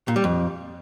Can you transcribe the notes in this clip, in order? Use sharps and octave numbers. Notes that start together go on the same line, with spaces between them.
A#2
G3
F2